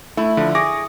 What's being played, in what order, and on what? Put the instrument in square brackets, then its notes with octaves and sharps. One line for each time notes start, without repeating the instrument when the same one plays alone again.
[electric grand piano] A3 [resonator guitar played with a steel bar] E4
[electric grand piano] D3 F3
[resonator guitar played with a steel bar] G#4 [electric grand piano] C#6 D6 A#6